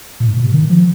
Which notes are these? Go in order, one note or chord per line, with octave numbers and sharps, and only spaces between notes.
A#2
G#2
A#2
C3
D#3
F3